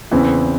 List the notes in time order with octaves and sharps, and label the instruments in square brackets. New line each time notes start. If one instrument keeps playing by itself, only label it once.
[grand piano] E2 C#3 E3 C4